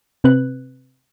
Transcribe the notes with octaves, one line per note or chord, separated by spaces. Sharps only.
C3 C4 B4 F#6